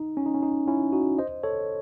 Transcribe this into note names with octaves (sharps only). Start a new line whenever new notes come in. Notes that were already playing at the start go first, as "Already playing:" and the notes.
Already playing: D#4
C#4
D#4
C#4
D#4
C#4 E4
D#4 F#4
C5 D#5
A4 C#5